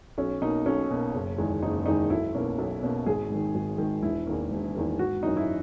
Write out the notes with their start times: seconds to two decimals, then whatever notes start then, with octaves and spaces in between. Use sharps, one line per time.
0.18 B1 C#4
0.41 B2 A#3 D#4
0.66 B1 C#4
0.90 B2 A#3
1.14 F#1
1.38 E2 D#3 G#3
1.62 F#1 D#4
1.86 E2 D#3 G#3 D#4
2.10 B1 E4
2.34 B2 A#3 C#4
2.58 B1
2.82 B2 A#3 C#4
3.06 G#1 G#4
3.30 G#2 D#3
3.55 G#1
3.78 G#2 D#3
4.03 E1 E4
4.27 E2 D#3 A#3
4.51 E1
4.75 E2 D#3 A#3
4.99 G#1 F#4
5.23 F#2 E3 D#4
5.37 E4